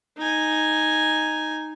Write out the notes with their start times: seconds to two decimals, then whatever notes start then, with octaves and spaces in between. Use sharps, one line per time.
0.18 D#4 G#5